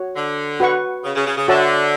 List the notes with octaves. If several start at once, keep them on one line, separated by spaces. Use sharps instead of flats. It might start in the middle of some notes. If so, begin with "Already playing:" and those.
Already playing: F#4 C#5
D3
F#4 B4 F#5 C#6
C#3
C#3
C#3
C#3
D3 F#4 C#5 E5 A5